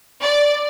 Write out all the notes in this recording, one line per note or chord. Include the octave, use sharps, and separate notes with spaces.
D5